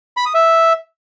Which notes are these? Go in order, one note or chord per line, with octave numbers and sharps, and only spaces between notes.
B5
D#6
E5